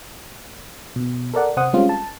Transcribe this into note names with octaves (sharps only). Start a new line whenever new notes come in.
B2
A4 A#4 D5 F#5
C3 C5 F#5 D#6
G3 G#3 C4 C#4 F4
A5